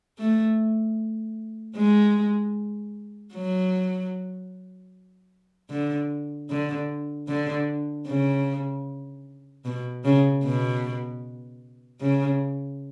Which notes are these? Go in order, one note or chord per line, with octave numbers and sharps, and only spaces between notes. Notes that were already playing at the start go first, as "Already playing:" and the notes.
A3
G#3
F#3
D3
D3
D3
C#3
B2
C#3
B2
C#3